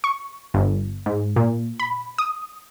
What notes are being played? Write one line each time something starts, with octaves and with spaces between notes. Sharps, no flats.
C#6
G1
G#2
A#2
B5
D#6